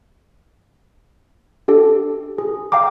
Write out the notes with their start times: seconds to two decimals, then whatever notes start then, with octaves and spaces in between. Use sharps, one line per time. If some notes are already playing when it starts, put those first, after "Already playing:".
1.68 D4 G4 A4
2.38 G#4
2.72 F5 G5 A#5 D6